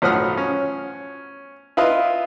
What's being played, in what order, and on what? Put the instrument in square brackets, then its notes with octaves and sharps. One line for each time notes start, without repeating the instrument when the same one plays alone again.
[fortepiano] B1 A2 F3 F#5 D#6 F6
C#4
E4 F4 B4 D#5